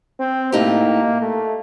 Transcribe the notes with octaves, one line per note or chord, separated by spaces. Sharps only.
C4
A2 A3 A#3 D#4 G4
A3